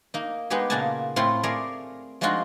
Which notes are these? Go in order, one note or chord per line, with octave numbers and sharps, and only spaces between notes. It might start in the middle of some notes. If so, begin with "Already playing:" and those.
A#3 D#4
G#3 B3 D#4 G4 G#4
A#2 C#3 A#3 F#5 G#5 A5
A2 A3 C4 E4 F4 C6
A3 G#4 A#4 D5 E5 F5
F3 G#3 D4 D#4 F4 F#4